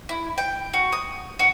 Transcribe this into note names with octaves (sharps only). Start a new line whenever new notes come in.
E4
G5
F#4
D#6
F#4